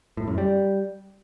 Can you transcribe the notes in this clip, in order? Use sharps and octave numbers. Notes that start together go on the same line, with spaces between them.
A2
F#2
G3